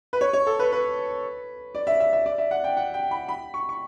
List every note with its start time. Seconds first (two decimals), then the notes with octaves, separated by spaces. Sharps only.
0.13 B4
0.21 C#5
0.33 C#5
0.47 A4
0.59 B4
0.72 B4
1.75 D5
1.87 E5
2.00 E5
2.13 E5
2.26 D5
2.38 E5
2.51 F#5
2.64 G5
2.77 F#5
2.94 G5
3.11 B5
3.29 B5
3.54 C#6
3.69 C#6